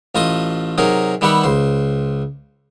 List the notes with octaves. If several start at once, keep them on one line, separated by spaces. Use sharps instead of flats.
A1 A3 F4 D#5 D#6
C3 F#3 D#4 G#4 A#4
D#3 G3 B3 G4 E5 F#5
C#2 C5